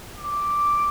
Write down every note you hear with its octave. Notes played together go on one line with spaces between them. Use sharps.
D6